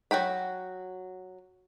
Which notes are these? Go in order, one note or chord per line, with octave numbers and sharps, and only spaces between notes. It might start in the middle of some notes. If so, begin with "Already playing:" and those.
F#3 F#4 G5 B5